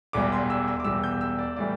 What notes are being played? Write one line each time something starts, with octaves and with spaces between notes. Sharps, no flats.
E1 E2 E3 G3 D6
C6
E6
E6
D6
E1 E2 E3 G3 E6
G6
E6
D5
A2 E3 G3 D5